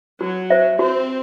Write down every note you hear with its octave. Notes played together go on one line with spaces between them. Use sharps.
F#3 F#4
C5 E5
C4 F#4